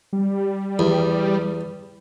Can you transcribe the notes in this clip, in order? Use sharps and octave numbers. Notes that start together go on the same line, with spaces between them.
G3
E2